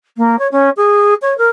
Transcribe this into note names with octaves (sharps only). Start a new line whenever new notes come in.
A#3
C#5
C#4
G#4
C#5
A#4